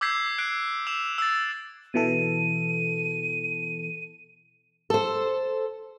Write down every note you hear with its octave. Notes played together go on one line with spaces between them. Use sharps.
D6 E6 G6 G#6 B6 C7
F#6 C7 D7
E6 E7 F7
E6 A6
B2 E3 A4 D#7
A4 C5